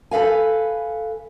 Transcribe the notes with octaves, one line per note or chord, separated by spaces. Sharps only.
A4 B4 F5 G#5